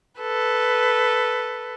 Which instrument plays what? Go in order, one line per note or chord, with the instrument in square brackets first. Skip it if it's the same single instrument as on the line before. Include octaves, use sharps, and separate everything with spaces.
[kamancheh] A4 B4